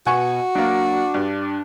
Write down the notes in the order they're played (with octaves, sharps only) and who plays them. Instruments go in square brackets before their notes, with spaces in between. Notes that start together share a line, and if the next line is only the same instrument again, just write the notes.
[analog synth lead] B2 [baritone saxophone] F#4 [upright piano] F#5 G#5 C#6
[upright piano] F#3 A#3 [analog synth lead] D4
[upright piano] G2